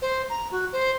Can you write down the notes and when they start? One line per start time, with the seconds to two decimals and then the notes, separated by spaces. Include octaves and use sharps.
0.02 C5
0.29 A#5
0.51 F#4
0.72 C5